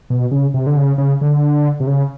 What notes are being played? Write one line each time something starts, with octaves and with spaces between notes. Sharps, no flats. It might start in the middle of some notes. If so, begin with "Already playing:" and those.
B2
C#3
C3
D3
C#3
C#3
D3
C3
C#3